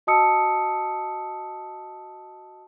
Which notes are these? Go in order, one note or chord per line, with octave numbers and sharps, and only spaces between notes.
F#4 D#5 A5 D#6 E6 C#7